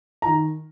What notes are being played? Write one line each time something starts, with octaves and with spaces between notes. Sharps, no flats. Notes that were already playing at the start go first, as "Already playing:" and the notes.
A#5
D#3